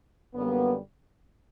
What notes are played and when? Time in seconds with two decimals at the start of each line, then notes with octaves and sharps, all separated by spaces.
0.35 F#2 D3 G3 A#3 B3